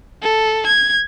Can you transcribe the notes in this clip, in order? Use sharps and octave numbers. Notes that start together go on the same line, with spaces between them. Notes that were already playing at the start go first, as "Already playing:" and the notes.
A4
G#6